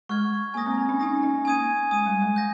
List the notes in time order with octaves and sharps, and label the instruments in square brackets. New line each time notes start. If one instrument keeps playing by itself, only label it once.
[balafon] G#3 [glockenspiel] C#6 F6 G#6
[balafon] A#3 [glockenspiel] G#5 D#6 A#6
[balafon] C4
A#3
C#4
[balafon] D#4 [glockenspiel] G#5 D#6 A#6
[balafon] C#4
[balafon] A#3 [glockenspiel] G#5 D#6 G#6 D#7
[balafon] G#3 [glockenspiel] G#5 D#6 G#6 D#7
[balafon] G3
G#3
[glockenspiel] G6 A#6